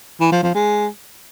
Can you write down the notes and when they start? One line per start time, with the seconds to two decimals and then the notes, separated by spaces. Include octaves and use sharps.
0.20 E3
0.32 F3
0.43 F3
0.54 G#3